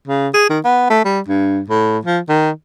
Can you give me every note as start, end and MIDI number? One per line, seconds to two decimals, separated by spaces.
0.08 0.29 49
0.34 0.49 68
0.50 0.60 51
0.65 0.87 59
0.90 1.04 57
1.05 1.20 55
1.28 1.61 43
1.69 1.99 45
2.05 2.19 53
2.29 2.51 51